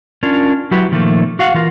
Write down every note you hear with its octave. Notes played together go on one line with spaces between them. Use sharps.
C#4 D4 F4 A#4
F#3 E4 F#4 G4 B4
A#2 D#3 F3 A3 A#3
F#4 F5 F#5
E3 F4 A#4